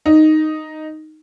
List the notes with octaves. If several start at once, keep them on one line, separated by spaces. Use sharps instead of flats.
D#4